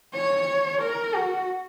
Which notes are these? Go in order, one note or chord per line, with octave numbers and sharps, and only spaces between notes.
C#5
A#4
F#4